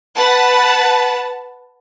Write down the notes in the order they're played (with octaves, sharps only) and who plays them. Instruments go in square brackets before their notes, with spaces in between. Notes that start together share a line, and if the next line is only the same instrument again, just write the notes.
[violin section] B4 F#5 A5